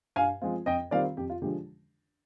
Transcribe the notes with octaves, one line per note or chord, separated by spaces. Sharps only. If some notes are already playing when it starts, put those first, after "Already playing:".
G2 F5 G#5
F3 G#3 C4 F4
F2 D#5 G5
D#3 G3 C4 F4 D5 F5
F2 G4
F4
D3 F3 G#3 D4 G4